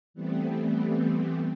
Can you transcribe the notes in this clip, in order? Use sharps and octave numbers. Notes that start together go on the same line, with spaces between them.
E3 G3 A3 B3 C4